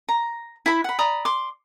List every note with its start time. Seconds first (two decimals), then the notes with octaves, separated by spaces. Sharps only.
0.09 A#5
0.66 E4 B5
0.84 F#5 B5
0.99 D5 A#5 B5 D#6
1.25 C6 D6